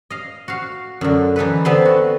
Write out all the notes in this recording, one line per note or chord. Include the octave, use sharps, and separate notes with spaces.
D#5 F5
F#4 F5
F#2 D3
E3 D#4 A4 B4
D3 B3 C4 B4 A5 C6
F#4